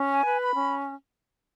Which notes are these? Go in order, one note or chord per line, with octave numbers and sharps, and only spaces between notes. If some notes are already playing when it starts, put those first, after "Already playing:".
Already playing: C#4
G#5
B4
B5
C#4